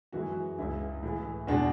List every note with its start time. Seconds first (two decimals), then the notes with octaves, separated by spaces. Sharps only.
0.13 F#2 E3 G#3 F#4
0.58 C#2 C#3 G#3 E4
1.03 A2 E3 G#3
1.47 E2 B2 G#3 D4